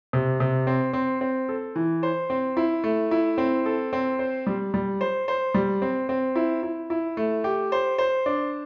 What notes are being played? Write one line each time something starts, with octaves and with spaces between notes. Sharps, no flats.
C3
C3
C4
C4
C4
A4
E3
C5
C4
E4
A3
E4
C4
A4
C4
C5
G3
G3
C5
C5
G3
C4
C4
E4
E4
E4
A3
G4
C5
C5
D4